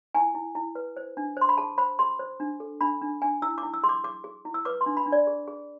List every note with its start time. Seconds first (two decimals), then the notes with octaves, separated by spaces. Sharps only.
0.15 E4 G#5
0.35 E4
0.55 E4
0.75 B4
0.97 C5
1.17 D4
1.37 C5 C6
1.49 B5
1.58 G#4 A5
1.78 C5 B5
1.99 G#4 C6
2.19 C5
2.40 D4
2.60 A4
2.81 D4 B5
3.01 D4
3.22 D4 G#5
3.42 E4 E6
3.58 D6
3.63 E4
3.74 E6
3.83 G#4 C6
3.89 D6
4.04 G#4 D6
4.24 G#4
4.45 E4
4.54 E6
4.65 B4 D6
4.81 C6
4.86 D4
4.97 B5
5.06 D4
5.12 D5
5.27 G#4
5.48 G#4